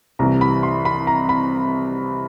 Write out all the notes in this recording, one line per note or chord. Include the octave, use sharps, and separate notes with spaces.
C2 C3 E3 A#5
B5
C6
B5
A#5
B5